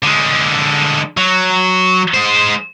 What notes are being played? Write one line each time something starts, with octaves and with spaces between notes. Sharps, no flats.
D3 G#3
F#3
G#3 C5